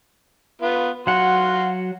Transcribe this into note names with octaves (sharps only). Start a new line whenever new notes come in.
B3 F4
F#3 F#4 F5 F#5 C6